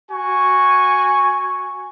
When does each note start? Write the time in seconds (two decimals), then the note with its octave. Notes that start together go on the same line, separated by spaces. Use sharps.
0.11 F#4 G#5 C#6